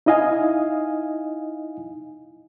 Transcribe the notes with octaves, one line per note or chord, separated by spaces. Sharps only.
D#4 E4 D#5 F5 G#5